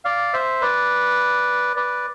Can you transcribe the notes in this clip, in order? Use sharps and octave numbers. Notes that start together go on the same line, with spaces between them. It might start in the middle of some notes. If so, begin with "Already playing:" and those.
D5 F5
C5 E5
B4 D5
B4 D5